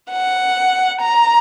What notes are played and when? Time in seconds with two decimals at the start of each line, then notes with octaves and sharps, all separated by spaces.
0.11 F#5
1.01 A#5